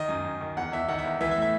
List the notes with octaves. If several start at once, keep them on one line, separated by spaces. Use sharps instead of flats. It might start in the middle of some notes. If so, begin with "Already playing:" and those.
Already playing: D#3 D#5
F#2
F#2
D#3
E2 F#5
E2 E5
D#3 F#5
E5
E2
E3 E5
E5
A2
E5